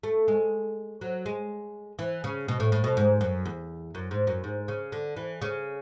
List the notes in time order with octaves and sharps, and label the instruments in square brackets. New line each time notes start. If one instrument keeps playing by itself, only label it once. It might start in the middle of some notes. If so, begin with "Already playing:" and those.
[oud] A3
G#3
F#3
G#3
E3
C#3
B2
A2
A2
B2
G#2
F#2
E2
F#2
G#2
F#2
G#2
C#3
D3
E3
C#3